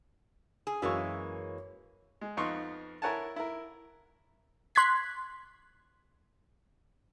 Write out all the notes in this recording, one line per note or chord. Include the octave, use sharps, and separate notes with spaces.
G#4
F#2 E3 G#3 A#3 C#6
G#3
F2 B3 D#4 F5 C6 C#6
E4 A#4 C#5 F#5 G#5 A5
E4 A#4
C6 F#6 G#6 B6